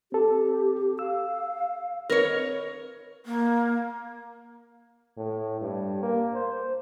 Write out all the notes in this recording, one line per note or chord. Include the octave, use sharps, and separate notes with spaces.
C4 G4 A4
F5 E6
C4 A#4 B4 C#5 D#5
A#3
A2
G2
A#3
C5